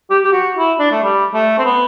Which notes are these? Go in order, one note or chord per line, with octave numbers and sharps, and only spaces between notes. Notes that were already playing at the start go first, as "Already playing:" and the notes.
G4
G4
F#4
E4
D4
A3
G3
A3
C4
B3